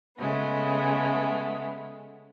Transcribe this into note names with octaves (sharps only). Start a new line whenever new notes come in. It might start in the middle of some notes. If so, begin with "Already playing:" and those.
C#3 G#3 A3 B3